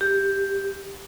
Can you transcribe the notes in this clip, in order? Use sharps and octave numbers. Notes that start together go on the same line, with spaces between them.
G4